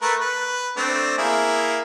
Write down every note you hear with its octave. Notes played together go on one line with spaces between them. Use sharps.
A3 A#4 B4
B4
A3 C4 D4
A#3 E4 G#4